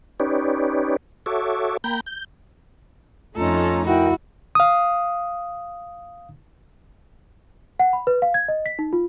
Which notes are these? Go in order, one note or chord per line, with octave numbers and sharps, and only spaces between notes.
C#4 D#4 G4 B4 C#5 D5
F#4 A4 C#5 E5 C#6 D6
A#3 G5 A#5 B5 G6
G6
F2 A3 C#4 D#4 F4 A4 A#5
E4 F#4 A#4 D#5 G5
F5 D#6
F#5
B5
B4
F5
G#6
D#5
B6
D#4
F4